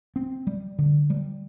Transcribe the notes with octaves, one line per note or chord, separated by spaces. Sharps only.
C4
G3
D3
G3